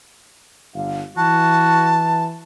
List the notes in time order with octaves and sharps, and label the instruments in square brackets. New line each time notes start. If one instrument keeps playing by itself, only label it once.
[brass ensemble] G1 D3 F5
[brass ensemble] E3 [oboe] F#4 [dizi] A5